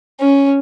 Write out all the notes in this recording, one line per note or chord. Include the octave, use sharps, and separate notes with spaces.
C#4